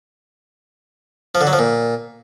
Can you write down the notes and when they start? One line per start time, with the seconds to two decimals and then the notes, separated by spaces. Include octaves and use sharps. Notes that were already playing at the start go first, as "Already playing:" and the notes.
1.35 F3
1.41 D3
1.47 F#3
1.53 F3
1.59 A#2